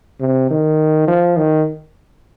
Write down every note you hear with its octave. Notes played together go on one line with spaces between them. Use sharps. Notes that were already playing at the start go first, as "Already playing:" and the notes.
C3
D#3
F3
D#3